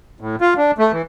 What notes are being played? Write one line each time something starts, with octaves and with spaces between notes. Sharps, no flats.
A2
F4
D4
A3
E3